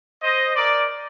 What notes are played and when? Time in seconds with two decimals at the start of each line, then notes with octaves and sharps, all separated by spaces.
0.22 C5 D#5
0.55 A#4 D5